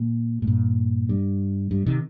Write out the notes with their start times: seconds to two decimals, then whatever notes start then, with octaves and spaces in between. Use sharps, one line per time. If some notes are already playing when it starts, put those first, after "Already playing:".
Already playing: A#2
0.42 A2
0.47 G2 A#2
1.09 G2
1.71 G2
1.86 C3 D#3